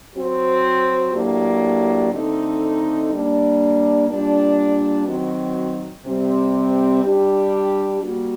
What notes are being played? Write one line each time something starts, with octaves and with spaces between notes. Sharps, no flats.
F#3 C4 F#4
A2 F#3 A#3 D4 G4
D3 A3 C4 D#4
G3 A#3 D4
A#2 G3 D4
D#3 F#3 C4 F#4
C3 G3 C4
G3 D4 G4
G3 A#3 F#4